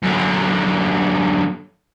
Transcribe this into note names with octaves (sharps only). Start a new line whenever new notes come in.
F#2 D3